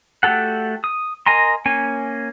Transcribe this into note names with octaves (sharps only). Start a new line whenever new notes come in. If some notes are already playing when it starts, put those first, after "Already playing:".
A3 F#4 G4 A4 F#5
D#6
A#4 D#5 G#5 A#5 C6
A#3 C#4 G#5